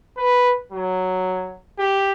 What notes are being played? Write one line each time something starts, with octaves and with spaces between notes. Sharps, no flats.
B4
F#3
G4